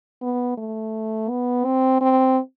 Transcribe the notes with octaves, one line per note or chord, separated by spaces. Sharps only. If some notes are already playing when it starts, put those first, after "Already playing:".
B3
A3
B3
C4
C4